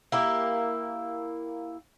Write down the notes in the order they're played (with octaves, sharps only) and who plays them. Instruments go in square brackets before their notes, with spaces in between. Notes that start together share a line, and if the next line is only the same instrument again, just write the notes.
[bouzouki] A#3 E4 G4